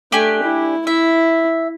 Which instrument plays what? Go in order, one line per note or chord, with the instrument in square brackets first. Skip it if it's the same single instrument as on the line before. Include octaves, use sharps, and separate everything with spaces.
[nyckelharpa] A3 [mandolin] D4 G4 G#5
[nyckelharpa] E4
[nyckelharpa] E4 [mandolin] E5